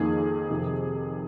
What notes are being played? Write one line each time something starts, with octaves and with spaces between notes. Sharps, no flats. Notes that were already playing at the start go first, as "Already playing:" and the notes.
Already playing: F2 D#3 A#3 D#4 G#4
F2 C3 D#3